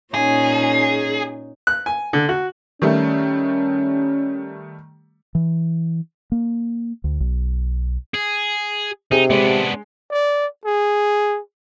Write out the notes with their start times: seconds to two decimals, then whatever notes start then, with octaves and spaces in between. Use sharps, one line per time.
0.14 A#2 C#4 D#4 G#4
1.67 F#6
1.86 G#5
2.13 D3
2.29 F#4
2.82 D#3 G3 A3 C#4
5.35 E3
6.32 A#3
7.04 D2
7.20 B1
8.14 G#4
9.11 C3 D#4 G#4
9.30 G#3 B3 D4
10.11 D5
10.66 G#4